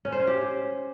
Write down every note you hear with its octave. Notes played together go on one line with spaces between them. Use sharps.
C#4
C5
C#4
G4